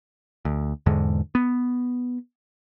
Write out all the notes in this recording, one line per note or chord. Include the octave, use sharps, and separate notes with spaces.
D2
E2 G#2 D3 G#3
B3